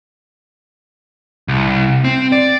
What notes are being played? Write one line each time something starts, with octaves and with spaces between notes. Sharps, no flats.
C2
C4
D5